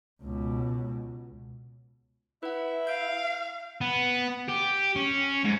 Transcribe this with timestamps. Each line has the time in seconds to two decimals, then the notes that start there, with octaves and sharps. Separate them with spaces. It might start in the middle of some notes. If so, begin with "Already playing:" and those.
0.23 C#2 B2
2.43 E4 B4 E5 F#5
2.87 F5 G6 D7
3.81 B3
4.49 G4
4.96 C#4
5.44 G#2